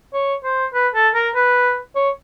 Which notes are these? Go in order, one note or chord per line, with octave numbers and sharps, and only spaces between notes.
C#5
C5
B4
A4
A#4
B4
C#5